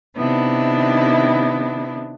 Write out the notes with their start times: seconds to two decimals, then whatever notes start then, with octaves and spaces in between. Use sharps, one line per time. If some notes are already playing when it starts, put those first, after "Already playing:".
0.16 C3 D#3 B3 D4 E4